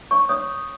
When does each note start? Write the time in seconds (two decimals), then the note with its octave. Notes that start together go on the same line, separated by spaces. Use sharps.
0.11 C#5 C#6
0.29 C#5 D#6